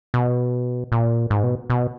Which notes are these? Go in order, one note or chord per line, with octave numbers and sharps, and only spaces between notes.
B2
A#2
G#2
B2
B2